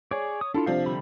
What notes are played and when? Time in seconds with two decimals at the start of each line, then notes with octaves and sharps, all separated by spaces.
0.11 G#4 C#5 D5
0.41 D#6
0.54 D4 E4 F4 A4
0.66 C3 F3 D4 F5
0.86 D3 G3 B5